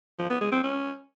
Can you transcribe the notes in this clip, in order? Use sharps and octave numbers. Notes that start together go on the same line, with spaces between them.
F3
B3
G#3
C4
C#4